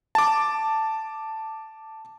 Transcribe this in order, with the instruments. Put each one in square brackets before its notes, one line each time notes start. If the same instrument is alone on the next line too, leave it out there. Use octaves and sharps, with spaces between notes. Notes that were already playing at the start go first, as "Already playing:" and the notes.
[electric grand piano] A5 D6